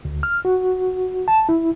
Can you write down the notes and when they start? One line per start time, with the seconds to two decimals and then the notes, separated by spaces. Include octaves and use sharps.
0.05 D2
0.23 F6
0.45 F#4
1.28 A5
1.49 E4